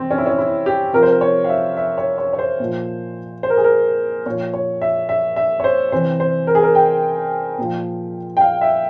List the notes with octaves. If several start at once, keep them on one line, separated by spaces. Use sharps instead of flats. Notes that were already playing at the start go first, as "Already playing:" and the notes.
Already playing: C3 E3 C4
C#4
E4
C#4
E4
G4
C3 F3 A#4
C5
A#4
C#5
F5
E5
E5
C#5
C#5
C#5
C5
A#2 F3
C5
A#4
G#4
A#4
A#2 F3 C#5
C#5
E5
E5
E5
C#5
C5
C3 E3 C5
C5
A#4
G#4
A#4
G5
A#2 F3
G5
F5
E5